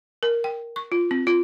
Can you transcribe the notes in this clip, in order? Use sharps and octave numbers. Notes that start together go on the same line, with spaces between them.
A#4
G5
C#6
F4
C4
F4